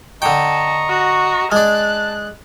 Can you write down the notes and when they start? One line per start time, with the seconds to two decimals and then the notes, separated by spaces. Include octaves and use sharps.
0.22 D3 D#5 G5 A5 A#5 C#6
0.89 F#4
1.52 G#3 D4 A5 F#6